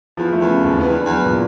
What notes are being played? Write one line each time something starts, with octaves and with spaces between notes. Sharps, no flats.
E2 F3
A3
E2
C#3
D#2
F2 B3
E2
D4
E2 F#3
A#2